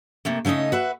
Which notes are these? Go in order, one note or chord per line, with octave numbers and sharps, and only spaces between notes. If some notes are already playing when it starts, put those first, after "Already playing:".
C3 A3 A#3
C#3 A3 C#4 D#4 D#5
F#4 B4 E5